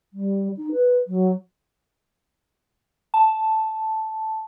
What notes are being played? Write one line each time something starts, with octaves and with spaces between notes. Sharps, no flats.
G3
D#4
B4
F#3
A5